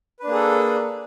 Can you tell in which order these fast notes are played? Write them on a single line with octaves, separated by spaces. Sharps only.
B4 D4 A#3 G#4 A4